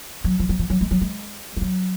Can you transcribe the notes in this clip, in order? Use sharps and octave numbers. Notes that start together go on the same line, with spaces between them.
F#3
F3
F#3
F3
F#3
G#3
F#3
G#3
F3
F#3